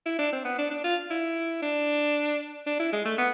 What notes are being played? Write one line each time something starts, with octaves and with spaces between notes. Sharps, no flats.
E4
D4
C4
B3
D4
D4
F4
E4
D4
D4
E4
G#3
A3
B3